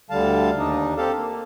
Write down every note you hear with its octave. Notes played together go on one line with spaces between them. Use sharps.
D2 D3 G3 F5 A5
D#2 D4 D#4
C4 G4 A4 F5 A5
A#3